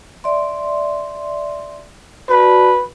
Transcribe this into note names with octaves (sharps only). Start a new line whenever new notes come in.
D5 E5 C6
F#4 B4 D5 A5